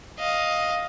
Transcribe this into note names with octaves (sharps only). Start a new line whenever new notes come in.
D#5 F5